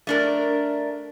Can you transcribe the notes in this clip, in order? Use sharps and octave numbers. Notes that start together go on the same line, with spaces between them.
A3 D4 A#4